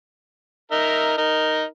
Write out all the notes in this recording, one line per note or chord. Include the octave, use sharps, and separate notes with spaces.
D#4 A#4 E5
D#4 A#4